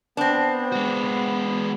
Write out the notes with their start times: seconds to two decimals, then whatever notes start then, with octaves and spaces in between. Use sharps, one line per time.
0.17 B3 C4 D4
0.72 G#3 F#4